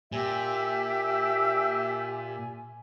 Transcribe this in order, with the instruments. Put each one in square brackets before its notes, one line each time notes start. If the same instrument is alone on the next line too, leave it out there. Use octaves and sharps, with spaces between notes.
[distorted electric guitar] A#2 [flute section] G4 E5 [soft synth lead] G#5